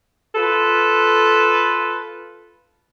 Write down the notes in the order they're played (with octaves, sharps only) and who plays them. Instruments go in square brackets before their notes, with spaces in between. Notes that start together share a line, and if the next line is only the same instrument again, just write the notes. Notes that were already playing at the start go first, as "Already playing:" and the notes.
[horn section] F4 A4 B4